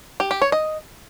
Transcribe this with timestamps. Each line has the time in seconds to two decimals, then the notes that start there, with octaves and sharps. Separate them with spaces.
0.20 G4
0.31 G4
0.42 C#5
0.52 D#5